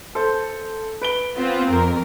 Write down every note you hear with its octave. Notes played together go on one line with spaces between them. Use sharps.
A4 C5
B4 D7 G7
B3 C4 F4
F2 A#4